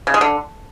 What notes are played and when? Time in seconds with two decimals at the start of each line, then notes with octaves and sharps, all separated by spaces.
0.07 C#3
0.14 G#3
0.21 D3